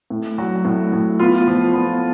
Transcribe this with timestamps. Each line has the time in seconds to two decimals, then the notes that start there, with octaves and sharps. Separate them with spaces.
0.10 A2
0.38 F#3 F#4
0.65 A2
0.93 A2
1.19 B3 F4
1.47 F3
1.74 B3